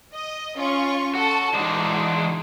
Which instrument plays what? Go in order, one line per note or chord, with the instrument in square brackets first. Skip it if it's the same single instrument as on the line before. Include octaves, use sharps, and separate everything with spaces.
[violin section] D#5
C#4 F4 C#6
[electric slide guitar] F#4 [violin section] A4 A5
[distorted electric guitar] E3 A5 [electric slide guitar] G#3 D4 [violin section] D#4 F#4